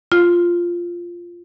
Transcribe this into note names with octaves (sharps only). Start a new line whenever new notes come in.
F4